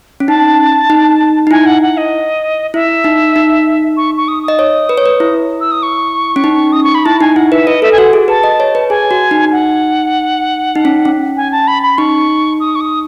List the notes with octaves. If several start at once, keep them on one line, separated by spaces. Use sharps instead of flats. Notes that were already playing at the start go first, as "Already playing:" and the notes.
C#4
D#4 A5
D#4
D#4
E4 G#5
F#5
F#5
D#5
E4 E5
D#4
D#4
C#6
C#6
D#6
D#6
D#5
C#5
B4
C#5
B4
E4
E6
D#6
C#6
C#4
D#4
D#6
C#6
B5
E4 A5
D#4 G#5
E4 F#5
B4 E5
B4 D#5
A4 E5
G#5
F#4 F#5
G#4
B4 A5
D#5
C#5
B4
G#4 G#5
F#4
D#4
F#5
D#4
C#4
C#4
G#5
A5
B5
B5
D#4 C#6
D#6
C#6
D#6